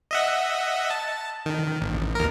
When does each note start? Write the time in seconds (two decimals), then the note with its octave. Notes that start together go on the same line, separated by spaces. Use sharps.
0.11 D#5 E5 F#5
0.90 A5
1.46 D#3
1.80 A1
2.15 D#2 A#4